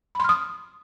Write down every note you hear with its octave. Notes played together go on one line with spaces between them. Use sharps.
B5 C6 D#6 F6